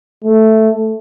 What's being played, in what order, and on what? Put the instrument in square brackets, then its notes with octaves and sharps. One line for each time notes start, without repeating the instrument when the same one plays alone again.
[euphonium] A3